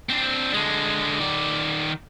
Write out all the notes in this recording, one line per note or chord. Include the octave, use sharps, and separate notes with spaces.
C4 D4
D3 G#3
D#3 D5